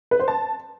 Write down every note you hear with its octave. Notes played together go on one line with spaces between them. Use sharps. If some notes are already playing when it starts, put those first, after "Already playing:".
B4
C5
A5